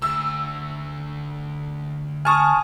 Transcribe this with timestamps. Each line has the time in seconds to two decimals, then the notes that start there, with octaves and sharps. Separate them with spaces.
0.02 D2 E6
2.25 G#5 A5 C#6 D#6 F6